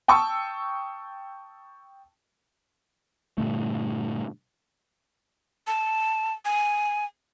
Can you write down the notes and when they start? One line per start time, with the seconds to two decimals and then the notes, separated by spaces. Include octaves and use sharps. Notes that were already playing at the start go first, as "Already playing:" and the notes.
0.08 G5 A5 C#6 D#6 E6
3.38 G2 A#2 D3 A3
5.67 A5
6.45 G#5